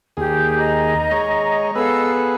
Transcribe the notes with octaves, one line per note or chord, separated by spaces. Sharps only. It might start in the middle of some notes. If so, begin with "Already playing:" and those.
D#2 G4 G#4
D#5 A#5
G#3 C#5
B3 G#4 A4 B4 F5 E6